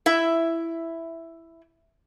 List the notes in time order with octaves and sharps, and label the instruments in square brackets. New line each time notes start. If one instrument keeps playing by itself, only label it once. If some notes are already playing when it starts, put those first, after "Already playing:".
[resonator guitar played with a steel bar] E4 E5